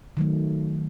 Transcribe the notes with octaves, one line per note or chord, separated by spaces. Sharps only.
D#3 F#3 A3